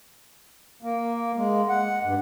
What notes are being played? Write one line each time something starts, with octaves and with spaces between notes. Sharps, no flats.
A#3
G#3
F#5
G2